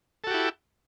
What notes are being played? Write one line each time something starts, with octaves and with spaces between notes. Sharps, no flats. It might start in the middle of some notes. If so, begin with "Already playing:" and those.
E4 F#4 G4 A4